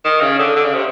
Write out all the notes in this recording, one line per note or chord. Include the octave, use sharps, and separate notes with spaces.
D#3
C#3
D3
D3
C#3
C3